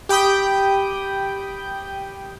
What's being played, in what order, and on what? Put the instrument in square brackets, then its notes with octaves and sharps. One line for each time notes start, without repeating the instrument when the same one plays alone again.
[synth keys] G4 G5 B5 D#6 G6